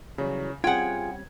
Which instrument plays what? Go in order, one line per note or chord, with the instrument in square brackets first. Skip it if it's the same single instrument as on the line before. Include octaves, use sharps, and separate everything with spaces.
[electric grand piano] C#3 [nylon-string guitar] E3 F#3 G3
[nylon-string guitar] G3 C4 C#4 [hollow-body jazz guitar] F4 G#4 [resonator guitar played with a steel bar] F#5 G5 [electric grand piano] G#6